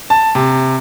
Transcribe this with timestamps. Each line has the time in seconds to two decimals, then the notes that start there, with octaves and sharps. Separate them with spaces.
0.10 A5
0.35 C3